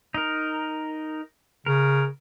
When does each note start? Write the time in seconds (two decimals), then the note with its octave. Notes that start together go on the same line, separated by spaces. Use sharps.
0.15 D#4 A#4
1.66 C#3 A#4